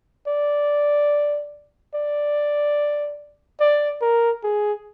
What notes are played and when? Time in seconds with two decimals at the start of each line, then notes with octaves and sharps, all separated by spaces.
0.27 D5
1.94 D5
3.60 D5
4.02 A#4
4.44 G#4